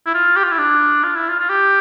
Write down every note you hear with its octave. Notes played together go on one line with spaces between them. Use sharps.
E4
F4
G4
F4
E4
D4
F4
E4
F4
F4
G4